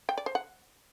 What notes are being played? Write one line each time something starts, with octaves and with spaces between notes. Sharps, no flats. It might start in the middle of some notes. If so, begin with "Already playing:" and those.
G5
D5
C5
F#5